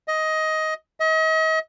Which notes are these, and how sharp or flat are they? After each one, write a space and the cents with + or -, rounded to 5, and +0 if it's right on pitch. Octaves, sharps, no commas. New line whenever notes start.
D#5 +15
D#5 +40